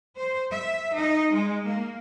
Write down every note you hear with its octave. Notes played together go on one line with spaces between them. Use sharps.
C5
E5
D#4
G#3
A#3